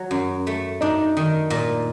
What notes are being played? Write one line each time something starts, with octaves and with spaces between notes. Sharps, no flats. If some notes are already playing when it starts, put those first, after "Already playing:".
Already playing: F#3
F#2
A3
D4 D#4
D#3
A#2